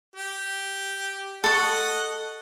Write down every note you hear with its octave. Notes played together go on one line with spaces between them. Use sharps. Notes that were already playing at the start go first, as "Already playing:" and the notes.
G4
A4 D#5 F#5 C#6